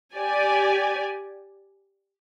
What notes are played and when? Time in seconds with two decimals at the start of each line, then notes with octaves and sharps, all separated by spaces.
0.15 G4 D5 G#5